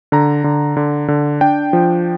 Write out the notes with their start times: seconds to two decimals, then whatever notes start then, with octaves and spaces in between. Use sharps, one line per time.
0.12 D3 A#5
0.44 D3
0.77 D3
1.08 D3
1.41 D4 G5
1.73 F3